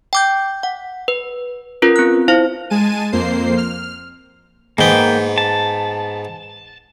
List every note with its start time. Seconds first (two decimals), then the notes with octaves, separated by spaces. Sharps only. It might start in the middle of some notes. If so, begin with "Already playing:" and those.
0.13 G5 D6 G6
0.63 F#5
1.08 B4
1.82 C#4 F4 A#4 B4
1.96 C4 F#6
2.28 E4 C5 F5
2.70 G#3 G#5 A5 D#7
3.12 F2 A#3 C5 C7
3.57 F6
4.78 G#2 A#3 B3 G5
5.38 A5